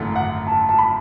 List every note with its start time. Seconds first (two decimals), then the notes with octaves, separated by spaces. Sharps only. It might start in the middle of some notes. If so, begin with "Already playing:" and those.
Already playing: G#1 F#2 D3 A3 E4
0.16 F#5
0.47 A5
0.69 A5
0.78 B5